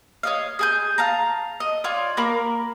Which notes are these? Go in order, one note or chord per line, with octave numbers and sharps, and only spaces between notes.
C#5 D#5 F5
G#4 G#5 G6
F5 A5 A#5
D#5
F4 C#5 D5
A#3 A#4 B5 D6